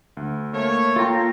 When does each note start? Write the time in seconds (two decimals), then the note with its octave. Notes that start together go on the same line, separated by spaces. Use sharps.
0.17 D2
0.54 A3 A#3 C#5
0.96 F4 A4 G5 A#5